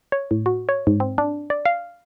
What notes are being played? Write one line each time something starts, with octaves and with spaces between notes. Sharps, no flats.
C#5
A2
F#4
C#5
G#2
C4
D4
D5
F5